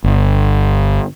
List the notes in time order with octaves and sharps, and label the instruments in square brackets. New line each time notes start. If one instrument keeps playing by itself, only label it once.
[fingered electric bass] G1